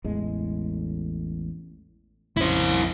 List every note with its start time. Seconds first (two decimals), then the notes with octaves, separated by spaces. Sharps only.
0.04 A1 E2 G#3
2.37 A#1 F2 C#4 E4 C5